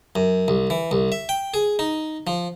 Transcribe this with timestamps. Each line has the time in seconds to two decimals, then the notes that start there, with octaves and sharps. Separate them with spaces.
0.16 F#2
0.48 C2
0.70 E3
0.91 C2
1.12 E5
1.29 G5
1.54 G#4
1.79 D#4
2.27 F3